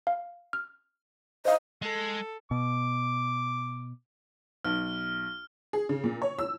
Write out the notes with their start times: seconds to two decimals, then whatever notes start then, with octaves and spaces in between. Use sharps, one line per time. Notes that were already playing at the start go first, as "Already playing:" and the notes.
0.07 F5
0.53 F6
1.45 C5 D#5 F5
1.82 G#3 A4
2.51 B2 D6
4.65 B1 F6
5.73 G#4
5.89 C#3
6.04 A#2
6.22 C#5
6.39 E6